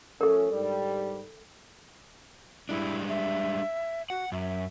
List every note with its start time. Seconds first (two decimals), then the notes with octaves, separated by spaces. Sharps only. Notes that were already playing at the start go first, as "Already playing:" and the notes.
0.21 F3 A3 C#4 A4 A#4
0.51 G#2 D3 G3
2.69 G3 G#3 D4 E4
3.09 E5
4.10 F#4 F#5
4.32 F#2 E5